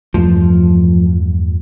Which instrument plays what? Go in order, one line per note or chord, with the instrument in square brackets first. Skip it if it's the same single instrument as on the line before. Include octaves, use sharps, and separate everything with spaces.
[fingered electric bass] E2 G2 A3 [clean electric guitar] F3